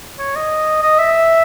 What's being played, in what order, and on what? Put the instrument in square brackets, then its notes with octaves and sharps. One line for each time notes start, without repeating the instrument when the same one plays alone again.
[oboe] C#5
D#5
D#5
E5